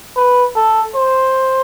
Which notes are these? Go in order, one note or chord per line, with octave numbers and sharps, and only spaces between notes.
B4
A4
C5